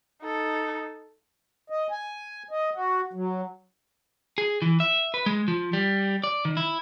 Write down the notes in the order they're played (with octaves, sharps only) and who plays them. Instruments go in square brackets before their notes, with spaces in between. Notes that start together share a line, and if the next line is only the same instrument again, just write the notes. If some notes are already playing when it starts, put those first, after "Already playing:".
[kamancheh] D#4 A4
[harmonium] D#5
G#5
D#5
F#4
F#3
[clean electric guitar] G#4
E3
E5
B4
G#3
F3
G3
D5
D#3
E4